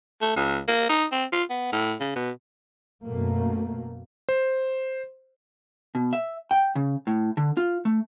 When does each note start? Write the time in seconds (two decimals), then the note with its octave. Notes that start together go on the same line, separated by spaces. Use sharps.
0.22 A3
0.36 C#2
0.68 A#3
0.89 D#4
1.12 C4
1.32 F4
1.50 B3
1.72 A2
2.00 C#3
2.16 B2
3.05 F#2 B2 A3 A#3
4.29 C5
5.95 B2
6.13 E5
6.51 G5
6.75 C#3
7.07 A2
7.37 D3
7.57 F4
7.85 A3